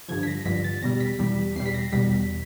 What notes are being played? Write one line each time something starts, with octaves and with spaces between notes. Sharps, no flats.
G2 D3 F3 G#6
B6
A#6
G2 D3 F3 B6
A6
E2 B2 G3 A#6
B6
E2 B2 G3
E2 B2 G3 C7
B6
A#6
E2 B2 G3 B6